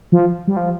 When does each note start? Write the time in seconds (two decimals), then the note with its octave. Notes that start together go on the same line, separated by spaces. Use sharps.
0.12 F3
0.48 G3
0.57 F3